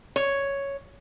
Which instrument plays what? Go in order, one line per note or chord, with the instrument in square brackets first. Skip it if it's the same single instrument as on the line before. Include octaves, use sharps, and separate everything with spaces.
[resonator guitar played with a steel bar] C#5